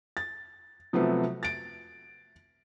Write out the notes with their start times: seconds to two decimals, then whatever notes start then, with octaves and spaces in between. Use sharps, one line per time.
0.17 A6
0.93 C3 F3 F#3 A3 B3
1.43 A6 D7